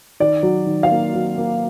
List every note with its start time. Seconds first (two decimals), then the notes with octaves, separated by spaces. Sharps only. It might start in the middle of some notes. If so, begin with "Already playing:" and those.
0.20 D#3 D5
0.43 F#3
0.66 D#3
0.83 F5
0.91 A#3
1.15 F#3
1.38 A#3